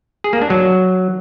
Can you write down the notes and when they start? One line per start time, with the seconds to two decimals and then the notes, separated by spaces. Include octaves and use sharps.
0.24 G#4
0.33 A#3
0.42 D4
0.50 F#3